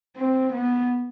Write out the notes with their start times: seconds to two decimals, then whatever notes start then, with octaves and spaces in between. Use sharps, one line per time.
0.17 C4
0.53 B3